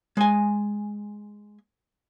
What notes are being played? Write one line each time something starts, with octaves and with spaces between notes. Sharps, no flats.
G#3 G#5